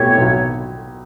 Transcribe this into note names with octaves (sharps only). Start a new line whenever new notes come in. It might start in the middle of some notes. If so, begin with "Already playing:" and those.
Already playing: B2 A3 E4 G4 C#5
B1